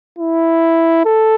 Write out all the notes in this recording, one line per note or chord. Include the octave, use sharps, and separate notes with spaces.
E4
A4